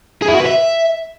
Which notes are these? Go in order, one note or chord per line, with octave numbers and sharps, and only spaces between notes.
G#4
E4
F#4
B4
E5